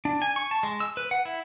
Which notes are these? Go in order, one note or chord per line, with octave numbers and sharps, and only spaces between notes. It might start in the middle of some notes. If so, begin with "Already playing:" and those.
D4
G#5
C#6
A5
G#3
E6
B4
F#5
E4